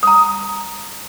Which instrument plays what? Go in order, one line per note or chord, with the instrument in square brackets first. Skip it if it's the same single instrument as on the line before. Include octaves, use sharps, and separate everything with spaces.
[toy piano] A#5 D#6